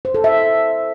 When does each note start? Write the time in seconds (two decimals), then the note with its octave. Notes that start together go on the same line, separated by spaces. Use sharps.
0.05 C5
0.14 A4
0.24 E5